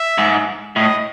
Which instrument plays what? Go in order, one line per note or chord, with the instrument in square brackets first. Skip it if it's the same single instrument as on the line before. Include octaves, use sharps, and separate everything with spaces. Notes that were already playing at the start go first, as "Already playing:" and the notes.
Already playing: [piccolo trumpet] E5
[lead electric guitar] G#2
[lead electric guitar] A2 [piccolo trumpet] D#5